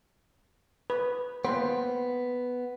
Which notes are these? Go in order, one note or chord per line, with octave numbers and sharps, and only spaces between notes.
B4
A#3 B3 B4 C5